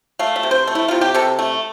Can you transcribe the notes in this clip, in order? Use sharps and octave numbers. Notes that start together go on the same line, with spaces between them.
A3 F5
E5
C3
C5
A3
E4
C3 F4
G4
C3 A4
A3